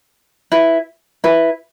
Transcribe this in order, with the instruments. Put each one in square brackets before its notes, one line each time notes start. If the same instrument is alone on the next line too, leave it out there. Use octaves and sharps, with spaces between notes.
[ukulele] E4 B4
E4 B4